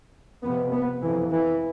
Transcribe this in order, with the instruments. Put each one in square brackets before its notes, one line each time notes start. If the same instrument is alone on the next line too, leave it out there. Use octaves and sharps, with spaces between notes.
[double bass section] F2 C3 B3
B3
F2 C3 E3
E3